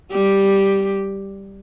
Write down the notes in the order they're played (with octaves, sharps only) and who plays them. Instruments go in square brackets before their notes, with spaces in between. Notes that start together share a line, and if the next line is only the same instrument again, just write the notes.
[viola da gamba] G3 G4